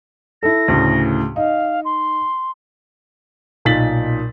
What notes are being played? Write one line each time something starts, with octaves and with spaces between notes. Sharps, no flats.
E4 A4 A#6
D2 A2 C#3
D#4 F5
C6
B1 A#2 D#4 A6 B6 F#7